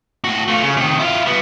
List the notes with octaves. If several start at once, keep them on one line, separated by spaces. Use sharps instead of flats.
A2 F#4
A3 F4
C#3
C3 D#3
E4 F4
G3 B3